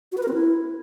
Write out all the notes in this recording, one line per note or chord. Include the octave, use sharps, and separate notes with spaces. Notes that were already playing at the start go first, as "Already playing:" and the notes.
F#4
B4
A#4
C4
E4